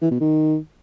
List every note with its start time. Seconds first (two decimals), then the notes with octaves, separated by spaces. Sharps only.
0.02 E3
0.11 B2
0.20 D#3